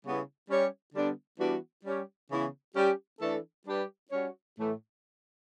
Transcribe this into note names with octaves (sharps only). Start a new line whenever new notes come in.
C#3 G3 B3 E4
G3 C#4 G4 C#5
D3 G3 B3 D4
E3 G3 B3 D4 F#4
G3 C#4 G4 C#5
C#3 E3 B3 E4
G3 C#4 G4
E3 A3 D4 A4
G3 D4 G4 B4
G3 C#4 F#4 C#5
A2 E3 A3